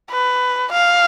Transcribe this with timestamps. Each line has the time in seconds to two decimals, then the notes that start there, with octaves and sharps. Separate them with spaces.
0.10 B4
0.72 F5